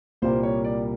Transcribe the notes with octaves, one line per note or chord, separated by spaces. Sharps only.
C2 A#2 G3 A#3 C5
C#5
D5